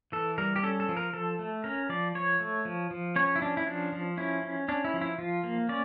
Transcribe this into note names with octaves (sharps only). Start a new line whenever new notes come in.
E3 A4
G3 A#4
G4
C#4 A4
A4
F3
A#4
F3 A4
A3
C#4 A#4
F3 D5
F3 C#5
A3
F3
F3
C#4 C#5
E4
C#4 D4
E4
F3 D4
F3
C#4 E4
C#4
C#4 D4
E4
F3
E4
F3 F4
A#3
C#4 D5